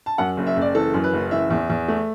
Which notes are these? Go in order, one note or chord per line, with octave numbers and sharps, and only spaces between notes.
A5
F#2 F#5
F#1
E5
F#1
D5
E3 A4
F#2
B4
F#1
E3 E5
E2
E2
A3